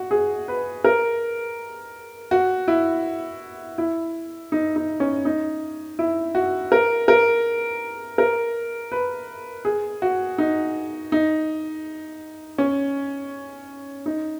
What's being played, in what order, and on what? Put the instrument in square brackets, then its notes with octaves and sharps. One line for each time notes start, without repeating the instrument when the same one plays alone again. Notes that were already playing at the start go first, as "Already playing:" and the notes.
Already playing: [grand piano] F#4
G#4
B4
A#4
F#4
E4
E4
D#4
D#4
C#4
D#4
E4
F#4
A#4
A#4
A#4
B4
G#4
F#4
D#4
D#4
C#4
D#4